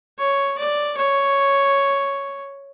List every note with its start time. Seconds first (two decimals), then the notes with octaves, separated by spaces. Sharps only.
0.19 C#5
0.58 D5
0.98 C#5